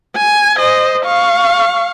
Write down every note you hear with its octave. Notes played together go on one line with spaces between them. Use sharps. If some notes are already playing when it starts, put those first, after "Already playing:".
G#5
C5 D#5
F5 C#6